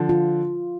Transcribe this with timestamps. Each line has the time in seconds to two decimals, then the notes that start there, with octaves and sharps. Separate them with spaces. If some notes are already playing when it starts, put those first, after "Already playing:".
Already playing: D3 F3
0.09 F4